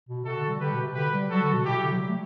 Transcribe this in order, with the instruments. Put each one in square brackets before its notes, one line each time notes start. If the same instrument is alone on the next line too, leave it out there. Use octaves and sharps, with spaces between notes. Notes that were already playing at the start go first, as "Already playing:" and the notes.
[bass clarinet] B2
[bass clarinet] C3 [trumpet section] F#4 A4
[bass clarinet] D3
G3
[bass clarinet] D3 [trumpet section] G4 B4
[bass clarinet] B2
C3
[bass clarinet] D3 [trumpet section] G4 B4
[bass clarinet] G3
[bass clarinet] F#3 [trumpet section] F#4 A4
[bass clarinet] D3
B2
[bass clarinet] B2 [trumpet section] E4 G4
[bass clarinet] C3
D3
F#3
G3
A3